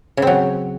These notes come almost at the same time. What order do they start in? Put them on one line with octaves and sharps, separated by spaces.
C#3 C4 F#3